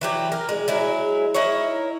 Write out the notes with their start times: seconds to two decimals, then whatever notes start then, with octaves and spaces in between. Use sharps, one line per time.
0.01 E3 F#3 G4
0.32 A#4
0.49 G#3
0.68 F#3 G#3 E4
1.34 D#4 E4 A#4 C#5